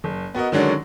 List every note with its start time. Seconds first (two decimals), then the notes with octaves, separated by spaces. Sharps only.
0.04 F#1
0.35 B3 F#4 A#4 D#5
0.52 D3 D#3 F#3 G#3 C#4 D4